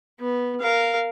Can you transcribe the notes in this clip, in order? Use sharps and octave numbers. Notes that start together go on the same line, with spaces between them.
B3
A#4 F5